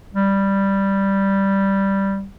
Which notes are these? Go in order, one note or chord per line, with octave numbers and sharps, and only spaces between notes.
G3